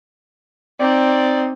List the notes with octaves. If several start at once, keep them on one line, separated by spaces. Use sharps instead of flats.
C4 D#4 D5